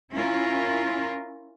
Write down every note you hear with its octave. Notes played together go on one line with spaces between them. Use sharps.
C#4 E4 F4 A#4